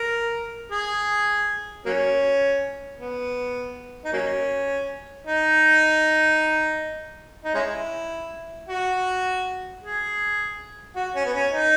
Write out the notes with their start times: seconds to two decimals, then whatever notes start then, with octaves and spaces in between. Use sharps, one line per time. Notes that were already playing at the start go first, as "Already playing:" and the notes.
Already playing: A#4
0.72 G#4
1.85 F#3 A#3 C#4
2.99 B3
4.05 D#4
4.13 F#3 A#3 C#4
5.27 D#4
7.45 D#4
7.54 G#3 C#4 E4
8.69 F#4
9.82 G#4
10.96 F#4
11.15 C#4
11.26 B3
11.34 C#4
11.52 D#4